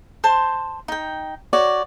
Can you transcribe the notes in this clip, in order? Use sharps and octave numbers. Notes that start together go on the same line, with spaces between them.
C5 A5 C6
D#4 G5
F#4 C#5 D5